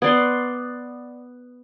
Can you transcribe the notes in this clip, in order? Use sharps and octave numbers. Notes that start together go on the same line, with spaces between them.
B3 D5 C6